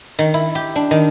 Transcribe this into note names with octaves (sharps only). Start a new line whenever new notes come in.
D#3
E4
G4
D4
D#3